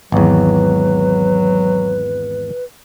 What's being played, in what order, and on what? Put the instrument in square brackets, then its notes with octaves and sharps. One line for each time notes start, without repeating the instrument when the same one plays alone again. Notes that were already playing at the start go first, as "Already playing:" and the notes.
[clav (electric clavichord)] G#1 E2 [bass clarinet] F#3 [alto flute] B4